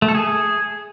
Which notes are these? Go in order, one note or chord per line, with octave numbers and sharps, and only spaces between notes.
A3
A4
G#4